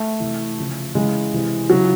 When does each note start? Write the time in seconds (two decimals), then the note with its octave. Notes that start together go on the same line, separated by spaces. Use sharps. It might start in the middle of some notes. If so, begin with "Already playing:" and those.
Already playing: A3
0.20 C3 E3
0.57 C#3 F3
0.95 C#3 E3 G#3
1.33 C3 E3
1.70 C#3 E3 F#3